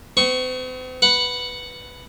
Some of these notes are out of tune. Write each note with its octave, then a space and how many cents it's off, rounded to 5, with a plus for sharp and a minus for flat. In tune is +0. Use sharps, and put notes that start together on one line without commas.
C4 -45 C#6 +0
B4 +0 F#5 +0